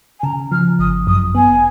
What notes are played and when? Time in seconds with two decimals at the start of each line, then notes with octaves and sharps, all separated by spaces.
0.19 G#5
0.23 C#3 A#5
0.51 F3 F6
0.79 G#1 D#6
1.07 F#2 D#6
1.35 B3 G#5